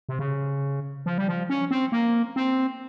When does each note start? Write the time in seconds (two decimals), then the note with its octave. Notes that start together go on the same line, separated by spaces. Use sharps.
0.09 C3
0.19 C#3
1.06 F3
1.18 G3
1.28 F3
1.50 C#4
1.71 C4
1.92 A#3
2.36 C4